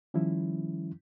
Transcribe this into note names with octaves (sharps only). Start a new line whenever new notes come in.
D#3 F3 G3 C#4 E4